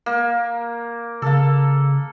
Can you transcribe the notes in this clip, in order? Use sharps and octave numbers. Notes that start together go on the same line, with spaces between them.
A#3
C#3 A#3 A4